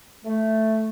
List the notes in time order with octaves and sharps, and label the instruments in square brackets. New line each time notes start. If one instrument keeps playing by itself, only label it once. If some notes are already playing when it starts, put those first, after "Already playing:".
[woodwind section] A3